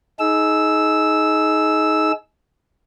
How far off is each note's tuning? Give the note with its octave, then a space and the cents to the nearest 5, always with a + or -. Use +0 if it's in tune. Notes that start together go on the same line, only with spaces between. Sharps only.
D#4 +15 G#4 +30 E6 +0